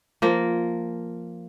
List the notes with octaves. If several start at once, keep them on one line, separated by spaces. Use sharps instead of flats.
F3 A#3